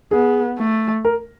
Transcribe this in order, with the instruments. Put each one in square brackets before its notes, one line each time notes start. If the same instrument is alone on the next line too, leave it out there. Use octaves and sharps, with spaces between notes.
[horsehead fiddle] B3 [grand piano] G#4
[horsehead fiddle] A3
[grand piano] A#4